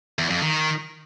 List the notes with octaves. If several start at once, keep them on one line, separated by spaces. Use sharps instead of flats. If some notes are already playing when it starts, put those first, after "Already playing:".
E2
F2
D#3